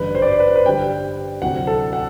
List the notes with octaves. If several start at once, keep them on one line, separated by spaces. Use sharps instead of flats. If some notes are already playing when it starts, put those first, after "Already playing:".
Already playing: A1 G2 D3 B4
C5
D5
C5
B4
C5
B4
G2 D3 G3 G5
D2 C3 F#3 C4 E4 F#5
A4
F#5